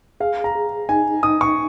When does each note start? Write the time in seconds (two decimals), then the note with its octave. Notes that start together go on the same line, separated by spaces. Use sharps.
0.20 G#4 F5
0.44 A#5
0.55 G#4
0.89 D#4 G#5
1.23 D#4 D#6
1.41 C#6